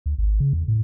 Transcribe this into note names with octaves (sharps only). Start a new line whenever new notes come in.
D2
G#1
C#3
E2
A2